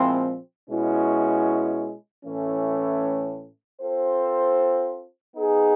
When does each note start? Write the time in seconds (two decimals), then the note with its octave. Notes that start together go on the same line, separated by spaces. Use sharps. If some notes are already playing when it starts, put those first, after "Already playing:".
Already playing: A#2 F3 G#3 C4 E4
0.69 B2 G#3 C#4 E4
2.24 A2 E3 A3 C#4
3.80 C4 F4 A4 C5
5.35 B3 D#4 G#4